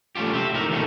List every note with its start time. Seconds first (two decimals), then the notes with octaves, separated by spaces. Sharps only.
0.15 A3 C#4 D#4 F4 G4
0.33 G4 E5
0.53 A2 D#4 A#4
0.70 D#3 E3 G3 A3 A#3 C#4